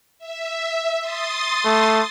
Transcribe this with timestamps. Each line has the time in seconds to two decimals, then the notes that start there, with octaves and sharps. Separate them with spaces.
0.19 E5
0.99 C6 D#6 A6
1.65 A3